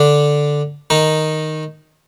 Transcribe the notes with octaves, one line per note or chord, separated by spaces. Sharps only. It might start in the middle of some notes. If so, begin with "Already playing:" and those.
Already playing: D3 D4
D#3 D#4